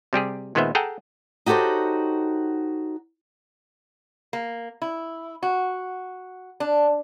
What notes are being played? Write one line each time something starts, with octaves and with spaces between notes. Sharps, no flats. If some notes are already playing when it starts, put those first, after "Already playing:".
C3 G3 G4 G#4
A#2 D#3 G#3 B3 C5 E5
G#4 A4 F#5 G5 A5 A#5
D#4 F#4 G4 A4 C5 C#5
A#3
E4
F#4
D4